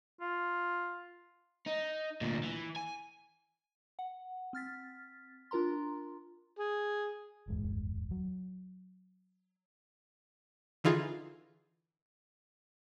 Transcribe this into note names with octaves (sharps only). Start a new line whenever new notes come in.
F4
D#4
D2 A#2
E3
G#5
F#5
C4 F6 A6 B6
D4 F4 A#4 A#5 C6
G#4
D1 G1 E2 G#3
F#3
D3 E3 D#4 F4 G#4